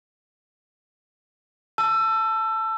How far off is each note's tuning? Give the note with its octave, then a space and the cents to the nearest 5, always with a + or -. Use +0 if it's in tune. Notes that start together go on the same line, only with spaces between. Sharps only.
A5 +0 E6 +25